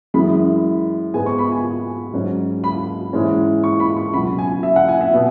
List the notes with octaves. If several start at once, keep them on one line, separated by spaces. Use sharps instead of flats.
F#2 E3 G#3 B5
G#2 G#3 B3 G#5
C#6
B5
G#5
G#2 F#3 C#4
B5
G#2 E3 G#3 C#4
C#6
B5
C#6
C#2 B2 F#3 B5
G#5
E5
F#5
G#5
E5
B2 B3